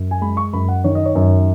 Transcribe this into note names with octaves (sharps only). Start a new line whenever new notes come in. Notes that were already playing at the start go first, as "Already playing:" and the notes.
Already playing: F#2
G#5
G#3 B5
C#6
F#2 B5
F#5
D#3 C#5
D#5
C#5
F#2